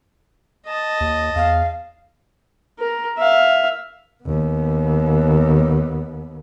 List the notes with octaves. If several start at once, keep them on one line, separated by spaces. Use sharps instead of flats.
D#5 A5
D#2
E2 F5
A#4
E5 F5
D#2 B3